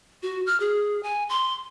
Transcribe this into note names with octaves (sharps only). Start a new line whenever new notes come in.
F#4
F6
G#4
G#5
C6